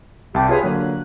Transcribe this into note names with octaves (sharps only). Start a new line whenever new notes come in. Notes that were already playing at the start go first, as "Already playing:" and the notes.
C2 G4 A5
F4 G4 G#4 B4 C#5
D3 F#3 A#3 F#6